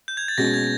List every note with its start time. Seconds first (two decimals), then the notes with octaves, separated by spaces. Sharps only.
0.08 G6
0.17 G#6
0.28 A6
0.38 B2 G#3 C#4 A#6
0.54 G#6